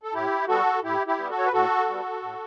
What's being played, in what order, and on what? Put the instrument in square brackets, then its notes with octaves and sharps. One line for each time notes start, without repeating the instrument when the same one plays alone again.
[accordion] A4
A2 E4 G4
G3 B3 F#4 A4
A2 E4 G4
E4 G4
G3 B3
F#4 A4
C#5
B4
A2 F#4 A4
G3 B3
A2